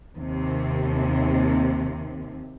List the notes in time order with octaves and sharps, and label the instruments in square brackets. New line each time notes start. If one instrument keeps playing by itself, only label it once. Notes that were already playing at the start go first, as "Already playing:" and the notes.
[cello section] D#2 C3